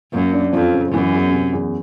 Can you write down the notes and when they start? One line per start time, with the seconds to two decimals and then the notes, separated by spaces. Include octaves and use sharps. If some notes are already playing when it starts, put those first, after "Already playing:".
0.13 F#2 A#3
0.33 D4
0.53 F2 F3
0.73 C#3
0.93 F#2 E3
1.13 E2
1.32 C3
1.53 E2